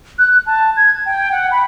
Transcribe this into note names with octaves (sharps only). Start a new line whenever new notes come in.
F#6
A5
G#6
G5
F#5
B5